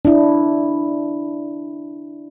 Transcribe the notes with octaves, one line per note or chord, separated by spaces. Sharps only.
D4 E4